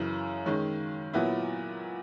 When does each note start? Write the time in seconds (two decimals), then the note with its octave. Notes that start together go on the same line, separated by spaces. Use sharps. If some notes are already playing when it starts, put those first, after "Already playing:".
Already playing: F#2 C#3 E3
0.46 D#3 G#3 C#4
1.13 A#2 F#3 B3 E4